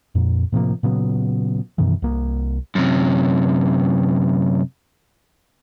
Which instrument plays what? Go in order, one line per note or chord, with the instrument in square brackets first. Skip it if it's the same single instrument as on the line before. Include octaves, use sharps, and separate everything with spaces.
[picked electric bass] F2 A#2
A2 C3 F3 A#3
A#2 C#3 F#3 B3
F#2 B2 D#3 E3
C2 A#3
[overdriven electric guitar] F#2 C3